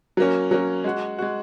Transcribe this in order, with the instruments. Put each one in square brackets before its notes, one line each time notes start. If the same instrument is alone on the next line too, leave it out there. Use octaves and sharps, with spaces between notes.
[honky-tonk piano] F#3 A#3 C#4
F#3 A#3 C#4
G#3 F#4
G#3 F#4